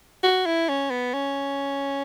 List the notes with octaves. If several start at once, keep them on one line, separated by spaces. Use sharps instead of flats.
F#4
E4
C#4
B3
C#4